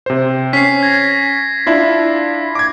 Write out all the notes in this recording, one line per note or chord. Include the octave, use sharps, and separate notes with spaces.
C3 C5
C#4 B6 C7
G#6 A#6
D4 E4 F4
D6 G#6